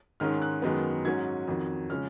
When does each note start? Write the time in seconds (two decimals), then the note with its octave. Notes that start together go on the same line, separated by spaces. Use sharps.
0.20 G#2 D#3 G#3 C#4 F6
0.42 F#6
0.62 F#2 D#3 G#3 B3
1.05 G#2 F#3 C#4 G#6
1.48 F2 D#3 F#3
1.90 C#3 F3 G#3 C#4 F6